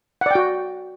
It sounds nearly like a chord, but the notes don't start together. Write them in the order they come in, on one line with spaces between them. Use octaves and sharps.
F#5 D5 G5 F#4